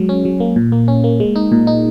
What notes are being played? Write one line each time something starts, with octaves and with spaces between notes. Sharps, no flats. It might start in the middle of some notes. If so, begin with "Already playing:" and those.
Already playing: F#3 G#3
C#4
F#3
A#3
A#2
A#3
C#4
A#3
G#3
D#4
A#2
D#4